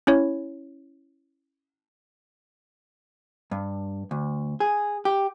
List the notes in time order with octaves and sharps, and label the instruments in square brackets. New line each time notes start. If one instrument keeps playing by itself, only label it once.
[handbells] C#4 E4 C#5
[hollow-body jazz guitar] G2
D2
G#4
G4